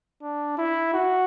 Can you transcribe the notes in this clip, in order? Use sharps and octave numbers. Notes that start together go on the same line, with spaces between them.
D4
E4
F#4